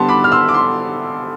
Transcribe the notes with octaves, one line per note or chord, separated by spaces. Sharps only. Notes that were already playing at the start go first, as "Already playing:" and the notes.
Already playing: D3 G3 B3 A5 C6
B5 D6
F6
C6 E6
D6
C6